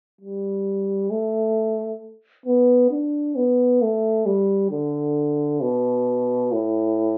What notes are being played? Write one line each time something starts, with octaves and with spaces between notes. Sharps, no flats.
G3
A3
B3
D4
B3
A3
G3
D3
B2
A2